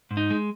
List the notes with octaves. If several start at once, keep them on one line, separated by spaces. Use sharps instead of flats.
G#2
D#4
G#3